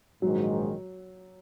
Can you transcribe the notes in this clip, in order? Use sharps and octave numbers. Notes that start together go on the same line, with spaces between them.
A#1 G#2 D#3 F#3 G#3